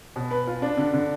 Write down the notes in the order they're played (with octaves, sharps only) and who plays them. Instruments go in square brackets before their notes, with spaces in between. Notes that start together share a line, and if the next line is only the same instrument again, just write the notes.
[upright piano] B2
B4
F4
D4
D3
D3